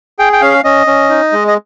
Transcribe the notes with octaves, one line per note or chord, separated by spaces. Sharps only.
G#4 G5
G5
C#4 F5
C#4 D#5
C#4
D#4
G#3
D#5